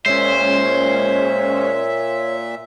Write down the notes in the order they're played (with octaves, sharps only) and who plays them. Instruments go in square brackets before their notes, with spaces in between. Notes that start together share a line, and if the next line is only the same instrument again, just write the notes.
[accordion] A#2 E5 [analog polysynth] G#3 C#4 [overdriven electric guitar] C5 [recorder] C#5